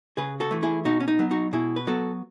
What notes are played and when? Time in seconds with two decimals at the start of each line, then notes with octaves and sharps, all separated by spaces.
0.17 C#3 G#4 B4
0.40 F#4 A4
0.51 E3 A3
0.63 E4 G#4
0.85 B2 D#4 F#4
1.00 C#4
1.08 D#4
1.19 F#3 B3
1.31 D#4 F#4
1.53 B2 E4 G#4
1.76 B4
1.87 F#3 B3 F#4 A4